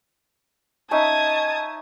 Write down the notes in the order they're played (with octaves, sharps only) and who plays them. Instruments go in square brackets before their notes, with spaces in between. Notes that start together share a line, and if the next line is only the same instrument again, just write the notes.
[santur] C#4 D#4 E5 [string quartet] A5 D#6 G#6